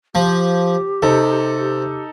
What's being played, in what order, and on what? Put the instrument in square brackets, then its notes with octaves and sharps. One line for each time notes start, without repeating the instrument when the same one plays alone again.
[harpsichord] F3 [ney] G4
[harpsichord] C3 [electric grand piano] D#4 A4